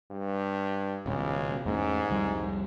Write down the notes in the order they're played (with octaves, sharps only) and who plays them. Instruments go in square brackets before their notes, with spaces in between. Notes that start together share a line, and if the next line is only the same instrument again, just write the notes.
[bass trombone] G2
[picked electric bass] D#1 B2 [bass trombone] C#2
[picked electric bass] E2 A3 C#4 [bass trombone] G#2
[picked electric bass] C2 F2 G3